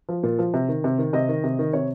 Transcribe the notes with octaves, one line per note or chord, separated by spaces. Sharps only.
F3
A#2
F3
C3
D#3
C3
D#3
C3 D#5
D#3
C3
D#3
C3 C#5